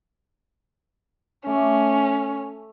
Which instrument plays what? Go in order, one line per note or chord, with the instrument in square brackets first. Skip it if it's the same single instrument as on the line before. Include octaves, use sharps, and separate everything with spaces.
[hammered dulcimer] A3 D6 [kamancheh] C#4